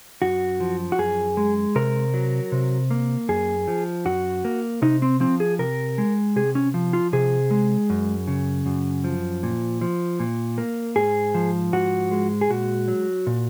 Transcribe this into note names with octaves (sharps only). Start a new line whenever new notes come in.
F#2 F#4
F3
F#4
F#2 G#4
G#3
C3 A#4
F#3
C3
A#3
F#2 G#4
F3
F#2 F#4
A#3
C3 D#4
C4
F3 C4
G#4
C3 A#4
G#3
C3 G#4
C#4
F3
F4
C3 G#4
G#3
F#2
C#3
F#2
F3
A#2
F3
A#2
A#3
G#2 G#4
F3
G#2 F#4
G#3
G#4
A#2 F#4
F#3
A#2